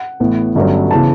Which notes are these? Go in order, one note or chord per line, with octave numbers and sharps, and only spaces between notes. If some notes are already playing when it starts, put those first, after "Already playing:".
Already playing: F#5
A1 A2 E3 B3
G1 G2 F#3 A3 C#4
C#3 E3 B3 A5